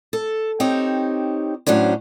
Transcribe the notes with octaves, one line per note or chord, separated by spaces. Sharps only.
A4
C4 D#4 G4 C#5
A2 F#3 C#4 D4 C5